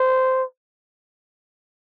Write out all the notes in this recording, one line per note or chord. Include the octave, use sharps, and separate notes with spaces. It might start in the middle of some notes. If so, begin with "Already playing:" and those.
Already playing: C5